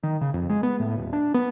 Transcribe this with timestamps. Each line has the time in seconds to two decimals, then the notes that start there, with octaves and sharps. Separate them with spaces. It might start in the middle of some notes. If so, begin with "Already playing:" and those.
0.03 D#3
0.21 C#3
0.34 F2
0.50 G#3
0.63 B3
0.80 A2
0.98 D#1
1.13 D4
1.34 B3